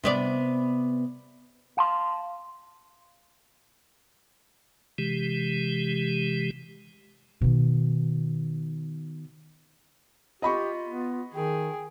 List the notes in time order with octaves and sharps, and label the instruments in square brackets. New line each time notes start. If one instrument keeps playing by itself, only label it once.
[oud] C3 B3 D5
[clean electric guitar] F5 A5 C6
[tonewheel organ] C3 E3 G#3 G4
[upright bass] B2 D#3
[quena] F4 [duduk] G4 [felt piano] D#5 B5 C#6
[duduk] B3
[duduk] D#3 [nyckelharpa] G#4 [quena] G5